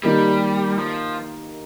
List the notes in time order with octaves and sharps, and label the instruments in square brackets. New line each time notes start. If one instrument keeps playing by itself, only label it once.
[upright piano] D#3 A#3 D#4 G4 [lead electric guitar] G3
[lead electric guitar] F3